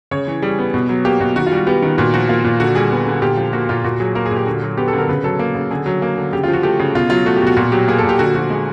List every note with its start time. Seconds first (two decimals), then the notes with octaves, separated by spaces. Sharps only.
0.11 C#3 C#5
0.27 E3
0.42 G3 G#4
0.59 B3
0.74 B2
0.89 F#3
1.05 A#3 G4
1.20 B2 F#4
1.36 D#3 F#4
1.47 F4
1.51 G3
1.57 F#4
1.67 B3 G4
1.82 D#3
1.98 A#2 F#4
2.14 F3 F#4
2.29 A#3 F4
2.44 A#2
2.60 D3 F#4
2.75 G3 G#4
2.91 B3
3.07 D3
3.22 A#2 G4
3.37 F3
3.53 A#3 F#4
3.69 A#2 F4
3.84 A#2 F#4
4.00 F#3 G#4
4.15 A#3 A#4
4.26 G#4
4.31 A#2
4.36 G4
4.46 D3 F#4
4.62 F#3
4.77 B3 G4
4.88 A4
4.93 D3
4.98 A#4
5.09 C#3 B4
5.24 F#3 A4
5.39 A#3
5.55 C#3
5.71 D3 G#4
5.86 F#3
6.02 A#3
6.18 D3
6.33 C#3 G4
6.43 F4
6.48 F3
6.53 F#4
6.63 A3 G4
6.80 C#3
6.95 B2 F4
7.10 F#3 F4
7.26 A3 F#4
7.37 G4
7.42 B2 F#4
7.56 A#2 F#4
7.72 F#3 G4
7.88 A#3 G#4
7.98 A4
8.03 A#2
8.09 G4
8.19 D3 F#4
8.35 F3 F#4
8.50 G#3